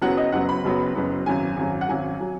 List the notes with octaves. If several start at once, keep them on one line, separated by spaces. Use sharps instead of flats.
F#1 F#2 F#3 B3 F#5
D#5
F#1 F#2 F#3 B3 F#5
B5
F#1 F#2 F#3 B3
F#1 F#2 F#3 B3
G#1 F#2 F#3 G#5
G#1 F#2 F#3
F#5
G#1 F#2 F#3 G#5
F#3